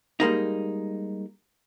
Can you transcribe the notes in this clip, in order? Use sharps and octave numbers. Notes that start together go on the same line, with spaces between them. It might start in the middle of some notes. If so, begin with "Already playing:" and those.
G3 G#3 A#3 D#4